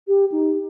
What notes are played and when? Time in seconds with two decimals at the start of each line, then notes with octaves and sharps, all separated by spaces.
0.08 G4
0.32 D#4